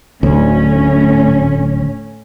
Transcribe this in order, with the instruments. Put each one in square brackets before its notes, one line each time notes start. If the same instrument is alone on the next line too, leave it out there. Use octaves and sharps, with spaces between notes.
[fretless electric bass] D1 D2 [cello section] A2 C#4